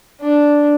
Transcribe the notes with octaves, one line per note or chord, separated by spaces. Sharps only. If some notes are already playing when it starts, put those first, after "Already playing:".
D4